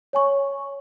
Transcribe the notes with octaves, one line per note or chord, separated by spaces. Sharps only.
C#5 G#5 C#6